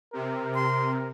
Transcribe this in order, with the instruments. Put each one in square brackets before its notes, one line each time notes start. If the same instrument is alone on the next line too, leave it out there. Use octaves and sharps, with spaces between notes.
[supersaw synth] C3 [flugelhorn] A#4
[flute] C6